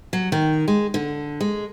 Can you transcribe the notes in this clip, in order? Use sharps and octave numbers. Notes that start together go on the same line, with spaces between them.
F#3
D#3
G#3
D3
G#3